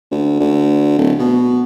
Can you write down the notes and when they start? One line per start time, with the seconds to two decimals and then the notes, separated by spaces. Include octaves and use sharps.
0.12 D2
0.40 D2
0.98 D1
1.19 B2